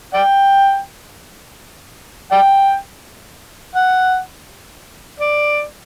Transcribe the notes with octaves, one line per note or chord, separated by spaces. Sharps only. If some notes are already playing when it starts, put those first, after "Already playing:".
D5 G5
D5 G5
F#5
D5